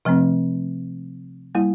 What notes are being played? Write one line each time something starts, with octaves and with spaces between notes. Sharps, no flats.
C3 F3 A3 C4
G3 A#3 E4